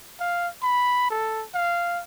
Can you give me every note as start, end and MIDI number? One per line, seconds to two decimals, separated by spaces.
0.20 0.48 77
0.63 1.10 83
1.10 1.44 69
1.54 2.02 77